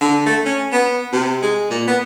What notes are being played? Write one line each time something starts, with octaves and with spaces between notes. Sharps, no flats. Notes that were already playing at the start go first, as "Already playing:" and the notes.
D3
A3
C#4
B3
C3
G#3
A#2
B3